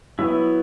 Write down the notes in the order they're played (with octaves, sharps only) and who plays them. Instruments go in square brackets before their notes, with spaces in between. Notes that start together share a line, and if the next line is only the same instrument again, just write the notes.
[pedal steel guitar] F#3 B3 E4